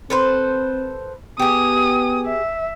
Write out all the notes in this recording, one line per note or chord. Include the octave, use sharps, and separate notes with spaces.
C4 A4 B4 C5
B3 G4 G#4 D#6
E5